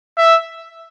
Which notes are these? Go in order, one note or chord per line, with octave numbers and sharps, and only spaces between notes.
E5